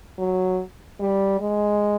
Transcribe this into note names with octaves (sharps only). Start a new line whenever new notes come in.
F#3
G3
G#3